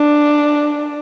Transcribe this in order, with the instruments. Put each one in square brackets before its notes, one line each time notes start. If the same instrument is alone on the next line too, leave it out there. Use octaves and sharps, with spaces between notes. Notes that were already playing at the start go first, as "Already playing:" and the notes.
Already playing: [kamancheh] D4